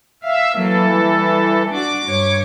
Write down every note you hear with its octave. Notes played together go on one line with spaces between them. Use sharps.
E5 F5
E3 F#3 A#3 A4
G3
D4 F#4 D6
G2 C#5